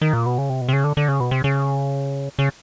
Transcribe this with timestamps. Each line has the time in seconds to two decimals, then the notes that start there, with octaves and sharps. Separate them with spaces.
0.01 D#3
0.13 A#2
0.26 B2
0.38 C#3
0.49 C3
0.61 B2
0.69 C3
0.73 C#3
0.84 D3
0.97 D3
1.08 C#3
1.20 B2
1.31 C3
1.44 C#3
2.39 C#3